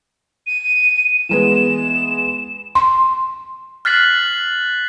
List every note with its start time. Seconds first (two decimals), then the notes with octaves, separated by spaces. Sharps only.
0.47 D#7
1.29 E3 G#3 B3 E7
2.75 C6
3.85 F6 F#6 A6 B6 C7 F#7